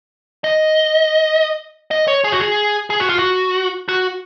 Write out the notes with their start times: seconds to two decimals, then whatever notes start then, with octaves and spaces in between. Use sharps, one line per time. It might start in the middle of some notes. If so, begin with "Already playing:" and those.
0.44 D#5
1.91 D#5
2.08 C#5
2.24 G#4
2.32 F#4
2.40 G#4
2.90 G#4
3.00 F#4
3.09 F4
3.19 F#4
3.89 F#4